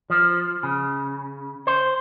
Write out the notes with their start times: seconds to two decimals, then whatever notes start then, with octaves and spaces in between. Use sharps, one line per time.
0.10 F3
0.63 C#3
1.67 C5